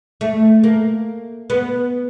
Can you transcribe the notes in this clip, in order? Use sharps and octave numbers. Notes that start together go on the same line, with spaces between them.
A3
A#3
B3